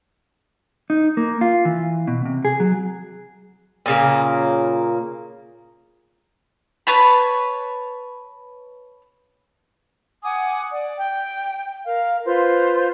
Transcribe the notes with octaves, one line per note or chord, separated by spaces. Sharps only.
D#4
A#3
F4
E3
B2
C3
G#4
F#3
A#2 C#3 A#3
B4 C#5 A5 B5
F#5 G#5 D6 D#6
D5
G5
A#4 F5
F4 B4 C5